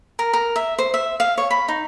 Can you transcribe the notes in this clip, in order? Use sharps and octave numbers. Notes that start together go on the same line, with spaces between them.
A#4
A#4
E5
C5
E5
F5
C#5
B5
D#4